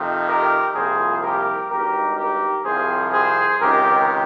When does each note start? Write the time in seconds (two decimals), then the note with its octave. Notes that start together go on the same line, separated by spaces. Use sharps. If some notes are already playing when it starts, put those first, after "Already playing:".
Already playing: F2 C3 D#3
0.27 G4 A#4
0.74 C2 A#2 F3 G#4 C5
1.22 G4 A#4
1.70 G#1 G2 D#3 G4 A#4
2.17 G4 A#4
2.65 C2 C3 F3 G#4 C5
3.12 G#4 C5
3.60 C#2 C3 D#3 G4 A#4